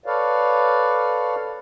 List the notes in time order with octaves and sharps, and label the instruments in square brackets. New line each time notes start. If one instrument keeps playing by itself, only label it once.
[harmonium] A4 B4 C#5 D5 F5